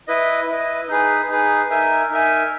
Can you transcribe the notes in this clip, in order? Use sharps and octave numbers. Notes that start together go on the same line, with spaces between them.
E4 B4 D#5
E4 B4 D#5
D#4 G#4 B4
D#4 G#4 B4
D#4 A#4 E5 G#5
D#4 A#4 E5 G#5